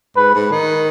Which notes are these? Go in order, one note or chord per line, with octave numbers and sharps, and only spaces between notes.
G#2 B4
G#2
D#3